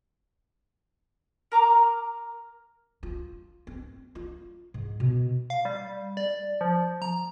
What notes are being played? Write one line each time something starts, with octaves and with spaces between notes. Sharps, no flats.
A#4 A#5 D6 F6
F4
C4
F4
G#2
B2
F5
G3
D5
F3
A#5